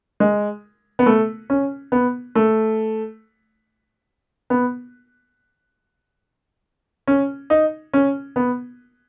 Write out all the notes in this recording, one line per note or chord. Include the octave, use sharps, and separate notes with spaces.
G#3
B3
A3
C#4
B3
A3
B3
C#4
D#4
C#4
B3